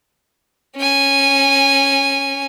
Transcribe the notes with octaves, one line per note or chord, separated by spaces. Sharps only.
C#4 G#5